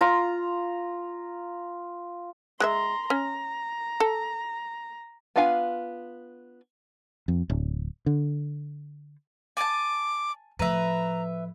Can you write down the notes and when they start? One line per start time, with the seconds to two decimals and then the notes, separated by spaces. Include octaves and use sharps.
0.01 F4 A#5
2.60 G#3 G#4 E5 A#5 C6
3.10 C#4 A#5
4.00 A4
5.36 B3 D4 F4 F5 G#5
7.28 F2
7.50 D1
8.06 D3
9.57 G#5 A5 D6
10.59 A2 F3 B4 E5 A#5